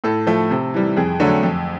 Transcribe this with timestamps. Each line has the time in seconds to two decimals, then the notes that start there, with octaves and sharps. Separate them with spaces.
0.04 A2 A4
0.27 F3 A3
0.51 C3
0.74 E3 G3
0.96 F2 G#4
1.20 D3 F#3 A3
1.43 F2